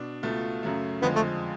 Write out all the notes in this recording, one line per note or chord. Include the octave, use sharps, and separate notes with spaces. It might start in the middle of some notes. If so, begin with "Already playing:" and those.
Already playing: B2 D4
C#2 B2 A3 F4
F#2 C#3 F#3 A3
F2 D3 F3 G#3 B3
A3